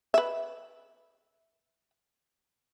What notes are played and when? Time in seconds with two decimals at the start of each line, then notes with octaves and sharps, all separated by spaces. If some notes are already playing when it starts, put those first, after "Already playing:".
0.14 B4 E5